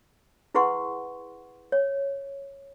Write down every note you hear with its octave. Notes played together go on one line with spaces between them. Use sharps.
E4 G#4 B4 F#5 C6 C#6
C#5